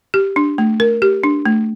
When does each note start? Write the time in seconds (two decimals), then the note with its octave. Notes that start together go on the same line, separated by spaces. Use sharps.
0.14 G4
0.36 D4
0.58 A3
0.80 A#4
1.02 G4
1.24 D4
1.46 A3